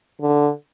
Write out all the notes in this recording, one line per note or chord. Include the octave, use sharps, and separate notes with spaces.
D3